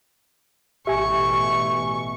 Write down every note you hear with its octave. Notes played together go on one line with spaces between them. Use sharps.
A1 B2 G4 E5 G#5 C#6